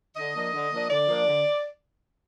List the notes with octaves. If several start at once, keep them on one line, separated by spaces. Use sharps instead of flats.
D3 D#5
F3 A#3 D4
D3
F3 A#3 D4
D3 D5
F3 A#3 D4
D3